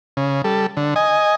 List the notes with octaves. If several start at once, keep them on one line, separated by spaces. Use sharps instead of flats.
C#3
G3 A4
D3
D#5 G#5